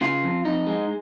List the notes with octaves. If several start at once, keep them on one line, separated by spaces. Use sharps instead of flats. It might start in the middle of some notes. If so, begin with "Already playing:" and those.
C#3 F4
F2
F2 D#4
G#3